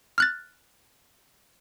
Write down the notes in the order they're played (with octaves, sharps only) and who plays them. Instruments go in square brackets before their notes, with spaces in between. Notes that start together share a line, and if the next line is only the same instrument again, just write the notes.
[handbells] F6 F#6 A6